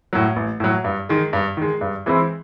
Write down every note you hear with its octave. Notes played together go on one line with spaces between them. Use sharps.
A2 F#3
A1
A2 F#3
G2
D#3 G#3
G2
D#3 G#3
G2
E3 G#3 C4 E4